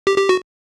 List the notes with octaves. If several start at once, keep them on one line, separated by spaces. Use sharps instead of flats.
G4
G4
F#4